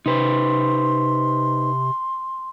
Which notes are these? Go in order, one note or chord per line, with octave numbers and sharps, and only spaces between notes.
C3 D#4 B4 C5 C6